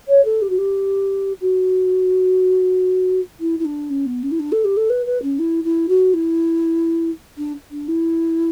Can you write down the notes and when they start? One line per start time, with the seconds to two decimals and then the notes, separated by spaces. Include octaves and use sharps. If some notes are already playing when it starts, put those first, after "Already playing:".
0.08 C#5
0.25 A4
0.42 G4
0.50 F#4
0.58 G4
1.41 F#4
3.40 E4
3.59 E4
3.65 D4
3.90 C#4
4.06 B3
4.23 C#4
4.31 E4
4.39 D4
4.52 A4
4.64 G4
4.77 A4
4.90 B4
5.06 B4
5.22 C#4
5.39 E4
5.64 E4
5.88 F#4
6.13 E4
7.37 D4
7.71 D4
7.88 E4